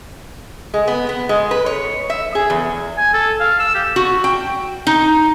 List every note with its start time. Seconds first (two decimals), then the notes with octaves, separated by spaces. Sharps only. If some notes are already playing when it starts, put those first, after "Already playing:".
0.74 G#3
0.88 B3
1.09 B3
1.29 G#3
1.51 B4
1.66 C#5
2.10 E5
2.35 G#4
2.50 E2
2.97 G#5
3.14 A4
3.40 F5
3.59 E6
3.75 G4
3.96 F#4
4.24 G5
4.87 D#4